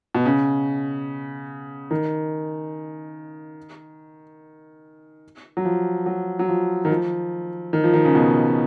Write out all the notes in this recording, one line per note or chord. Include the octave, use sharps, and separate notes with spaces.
B2
C#3
D#3
F#3
F3
F#3
F#3
F3
D#3
F3
D#3
F3
D#3
C#3
B2